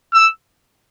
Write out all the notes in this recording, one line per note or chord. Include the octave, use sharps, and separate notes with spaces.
E6